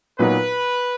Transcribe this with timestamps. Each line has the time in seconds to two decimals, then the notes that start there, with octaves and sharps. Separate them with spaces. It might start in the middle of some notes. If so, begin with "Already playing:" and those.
0.19 A#2 F#3 B3 D#4 F#4 B4